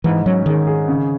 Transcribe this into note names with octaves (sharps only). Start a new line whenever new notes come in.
G#2 E3
F#3 C#4
D#3 G#4
G#4
C#3